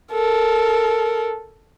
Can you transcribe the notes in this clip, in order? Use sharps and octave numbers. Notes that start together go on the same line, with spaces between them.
A4 A#4